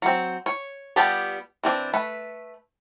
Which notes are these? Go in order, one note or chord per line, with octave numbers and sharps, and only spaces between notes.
F#3 C4
C#5
G3 B3 F4 G4 A5
E3 C4 D4
A3 B4